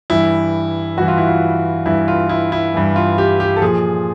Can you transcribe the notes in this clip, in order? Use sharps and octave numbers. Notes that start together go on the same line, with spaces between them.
G2 E3 E4
G2 E3 F#4
F4
E4
F4
G2 E3 E4
F4
E4
E4
G2 E3
F4
G4
G4
A4
A#2 F3 G#4